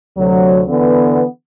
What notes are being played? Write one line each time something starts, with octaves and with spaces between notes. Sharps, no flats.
D2 C3 F#3
D3 E3 B3